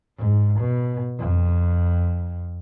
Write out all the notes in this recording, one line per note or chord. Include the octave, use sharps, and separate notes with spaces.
G#2
B2
F2